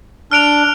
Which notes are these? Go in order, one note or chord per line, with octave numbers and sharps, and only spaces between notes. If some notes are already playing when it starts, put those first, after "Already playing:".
D4 F6 D7 F7